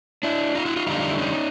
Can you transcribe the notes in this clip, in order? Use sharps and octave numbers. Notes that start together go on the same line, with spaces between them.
D4 E4
D#4 F4
E4 F#4
D#4 F4
F2 D3 G3 D#4 F4
F4
E4
C#4 D#4